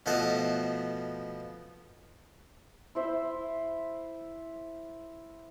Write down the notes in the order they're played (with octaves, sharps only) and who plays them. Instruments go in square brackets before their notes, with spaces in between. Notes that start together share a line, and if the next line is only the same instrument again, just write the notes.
[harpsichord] B2 F3 A3 B3 C5 D#5
[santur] E4 C5 E5